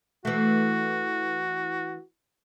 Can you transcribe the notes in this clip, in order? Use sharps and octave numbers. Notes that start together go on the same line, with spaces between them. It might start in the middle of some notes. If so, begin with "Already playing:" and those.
E3 A3 F#4